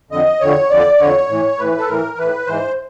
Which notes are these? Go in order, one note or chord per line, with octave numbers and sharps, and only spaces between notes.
F2 D3 D#5
F2 D3 C#5
F2 D3 D5
F2 D3 C#5
A2 E3
A2 E3 B4
A4
A2 E3 A#4
A2 E3 B4
G#2 E3 C5